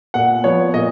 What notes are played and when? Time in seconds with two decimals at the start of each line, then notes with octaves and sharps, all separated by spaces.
0.14 A#2 F#5
0.44 F3 B3 C#5
0.74 A#2 D#5